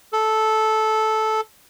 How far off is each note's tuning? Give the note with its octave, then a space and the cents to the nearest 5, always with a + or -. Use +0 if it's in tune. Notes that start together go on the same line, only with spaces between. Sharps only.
A4 -10